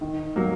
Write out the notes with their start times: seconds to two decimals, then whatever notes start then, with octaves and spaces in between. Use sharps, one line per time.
0.01 D#3
0.36 F#3 A#3